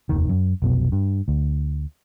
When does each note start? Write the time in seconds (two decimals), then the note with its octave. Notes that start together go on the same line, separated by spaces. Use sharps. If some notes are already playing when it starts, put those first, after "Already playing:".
0.09 F1 D#2 D#3
0.29 F#2
0.62 F1 B1 B2
0.92 G2
1.28 D2